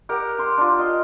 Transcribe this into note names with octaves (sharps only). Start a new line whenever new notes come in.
G4 A#4 F#5
A#5 C6
D4 F4
D#5